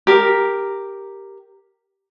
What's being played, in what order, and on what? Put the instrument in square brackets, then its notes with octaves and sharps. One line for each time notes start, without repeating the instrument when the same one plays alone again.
[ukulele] G4 A#4